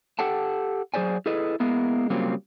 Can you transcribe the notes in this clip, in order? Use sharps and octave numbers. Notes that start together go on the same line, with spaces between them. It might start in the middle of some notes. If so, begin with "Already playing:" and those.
G4 A4 F#5 G5 A5
F#3 G#4 C5 D5 G#5
E4 G#4 A4 B4 D#5
G#3 A#3 B3 E4
C#3 F#3 G3 A#3 C4 F4